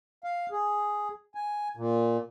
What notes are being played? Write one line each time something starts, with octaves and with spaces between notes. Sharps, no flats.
F5
G#4
G#5
A#2